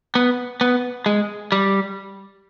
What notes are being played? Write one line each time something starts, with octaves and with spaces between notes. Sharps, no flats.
B3
B3
G#3
G3